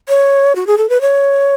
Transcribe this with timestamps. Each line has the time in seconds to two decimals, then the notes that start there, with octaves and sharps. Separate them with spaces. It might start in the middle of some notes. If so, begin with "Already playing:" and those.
0.09 C#5
0.56 F#4
0.67 G#4
0.78 A4
0.89 B4
1.01 C#5